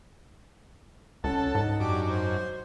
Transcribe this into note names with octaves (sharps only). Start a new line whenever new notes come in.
C#2 C#4 A4 F#5
G#2 D#4
F#2 D4 G4 D6
C5